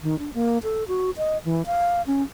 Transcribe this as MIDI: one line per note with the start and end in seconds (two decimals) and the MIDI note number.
0.03 0.19 51
0.19 0.33 62
0.34 0.58 58
0.63 0.84 69
0.88 1.11 66
1.17 1.38 75
1.45 1.62 52
1.66 2.02 77
2.07 2.23 61